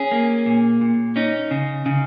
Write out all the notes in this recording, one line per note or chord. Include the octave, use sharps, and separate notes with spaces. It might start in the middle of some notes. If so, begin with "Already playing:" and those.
Already playing: C#4 G#4
A#3
A#2
A#2
C#4 D#4
C#3
C#3